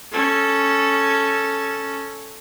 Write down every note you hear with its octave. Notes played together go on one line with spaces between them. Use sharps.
C#4 A4